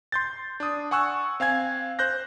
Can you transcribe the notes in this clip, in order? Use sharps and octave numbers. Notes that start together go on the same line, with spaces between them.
C6 G6 A6
D4 D#6
F#5 G#5 C#6 E6 F#6
C4 F5 G#5 G#6
C5 F#6 G6 A#6